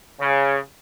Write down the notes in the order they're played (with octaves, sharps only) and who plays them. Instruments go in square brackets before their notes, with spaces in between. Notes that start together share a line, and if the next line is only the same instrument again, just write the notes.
[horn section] C#3